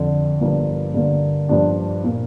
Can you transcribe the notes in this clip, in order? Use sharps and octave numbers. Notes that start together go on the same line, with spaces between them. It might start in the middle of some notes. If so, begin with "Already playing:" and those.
Already playing: F2 D3 F3
G1 G2 F3 A#3
G2 D3 A#3
G2 F3 D4 G4
A#2 A#3